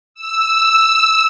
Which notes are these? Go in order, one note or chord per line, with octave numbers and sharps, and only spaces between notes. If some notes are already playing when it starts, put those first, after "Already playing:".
E6